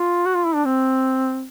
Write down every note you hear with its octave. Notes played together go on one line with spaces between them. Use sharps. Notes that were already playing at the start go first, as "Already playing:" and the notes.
Already playing: F4
F#4
F4
E4
D4
C4